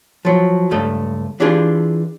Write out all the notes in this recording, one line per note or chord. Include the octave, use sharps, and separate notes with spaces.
F3 F#3
C#2 G2 A3 D#5
E3 D4 F4 G4 G#4